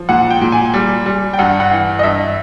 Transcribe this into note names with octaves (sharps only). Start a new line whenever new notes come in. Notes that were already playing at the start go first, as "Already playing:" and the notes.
Already playing: F3
A#2 F#5
G5
A#2
G#5
G3
G3
G5
G2 F#5
F#5
E3
D#5
G2 E5